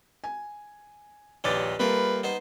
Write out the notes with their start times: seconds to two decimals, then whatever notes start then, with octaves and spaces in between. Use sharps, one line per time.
0.24 G#5
1.44 A#1 D#2 G3 G#3 B4 C#5 D6 A6
1.79 G3 A3 A#3 F4 A#4 B4
2.24 B3 D#4 C5